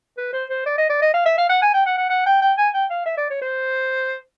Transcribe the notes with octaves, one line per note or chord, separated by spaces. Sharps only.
B4
C5
C5
D5
D#5
D5
D#5
F5
E5
F5
F#5
G#5
G5
F#5
F#5
F#5
G5
G5
G#5
G5
F5
E5
D5
C#5
C5